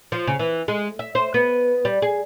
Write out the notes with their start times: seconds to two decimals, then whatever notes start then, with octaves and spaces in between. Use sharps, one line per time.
0.12 F3
0.27 C#3
0.39 E3
0.68 G#3
0.99 E5
1.15 C5
1.34 B3
1.85 G3
2.02 G#4